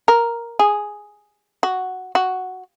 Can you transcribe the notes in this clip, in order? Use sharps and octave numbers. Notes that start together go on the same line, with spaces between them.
A#4
G#4
F#4
F#4